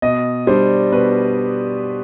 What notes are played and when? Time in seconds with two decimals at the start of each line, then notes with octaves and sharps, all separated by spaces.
0.02 B2 D#5
0.47 G3 D4 C5
0.92 B2 B4